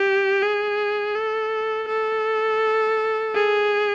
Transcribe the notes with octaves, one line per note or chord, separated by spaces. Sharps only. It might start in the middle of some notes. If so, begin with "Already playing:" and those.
Already playing: G4
G#4
A4
A4
G#4